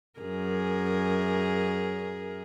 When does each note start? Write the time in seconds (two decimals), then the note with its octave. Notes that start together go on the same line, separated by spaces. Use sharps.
0.20 F#2 G#4 A#4